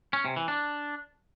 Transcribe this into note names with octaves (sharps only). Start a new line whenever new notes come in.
C#4
C3
E3
D4